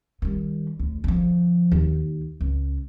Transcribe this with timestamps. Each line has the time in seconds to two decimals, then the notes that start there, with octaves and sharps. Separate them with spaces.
0.22 D#3 G3
0.79 D2
1.04 D3 F3
1.72 D#2
2.41 C#2